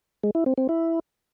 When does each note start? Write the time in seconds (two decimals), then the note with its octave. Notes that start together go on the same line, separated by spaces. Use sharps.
0.23 G#3
0.35 E4
0.46 C4
0.58 C4
0.69 E4